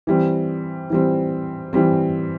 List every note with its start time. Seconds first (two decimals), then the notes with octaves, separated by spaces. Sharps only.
0.07 E3 G3 C4
0.90 E3 G3 C4
1.73 E3 G3 C4